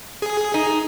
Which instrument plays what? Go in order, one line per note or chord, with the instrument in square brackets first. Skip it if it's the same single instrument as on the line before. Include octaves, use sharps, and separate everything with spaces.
[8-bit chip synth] G#4
[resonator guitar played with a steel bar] D#4